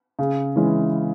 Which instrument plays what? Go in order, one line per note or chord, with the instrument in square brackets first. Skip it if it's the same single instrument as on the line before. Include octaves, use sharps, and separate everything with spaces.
[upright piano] C#3
E3 G#3 C#4 E4